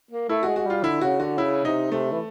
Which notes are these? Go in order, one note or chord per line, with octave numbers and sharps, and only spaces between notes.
A#3
A3 E4
F#4
G#3
F#4
G3 F4
D3 E4
C#3 F#4
D3 F#4
C#3 E4
C3 D#4
C3 A3
E3